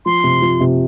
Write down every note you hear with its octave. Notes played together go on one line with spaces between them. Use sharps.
F3 C6
C3
F3
C3